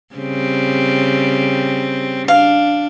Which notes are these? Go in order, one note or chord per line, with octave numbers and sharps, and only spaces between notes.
C#3 G3 C4
D4 F5